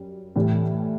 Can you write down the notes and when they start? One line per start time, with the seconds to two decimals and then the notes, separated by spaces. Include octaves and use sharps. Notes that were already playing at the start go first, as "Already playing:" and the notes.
Already playing: F#2 G3
0.36 A2 E3 G3